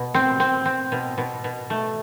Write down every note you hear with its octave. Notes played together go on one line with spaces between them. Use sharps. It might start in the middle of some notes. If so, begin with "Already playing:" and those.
Already playing: B2
C4
C4
C4
B2
B2
B2
A3